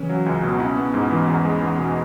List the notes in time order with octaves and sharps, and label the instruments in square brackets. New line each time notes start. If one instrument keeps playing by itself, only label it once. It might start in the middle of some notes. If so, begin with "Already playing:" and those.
Already playing: [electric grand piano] C#3 C#4 [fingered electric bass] E3
[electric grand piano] F#3
C#2
B2
[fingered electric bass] C#4 [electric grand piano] E4
[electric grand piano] B3
G#2
E3
E2
G#3
E2
B2